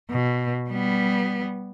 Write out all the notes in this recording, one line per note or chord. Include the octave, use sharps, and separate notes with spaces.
B2
G3 B3